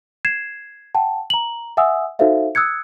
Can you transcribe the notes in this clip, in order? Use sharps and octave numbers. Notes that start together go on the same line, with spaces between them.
G#6 C7 E7
F#5 G5 A5
A#5 F#7
E5 F#5 G#5 D#6 E6
D#4 F#4 A4 C5 E5 F5
D#6 E6 F#6 G#6 C#7